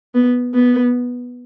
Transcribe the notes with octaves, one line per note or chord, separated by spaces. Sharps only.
B3
B3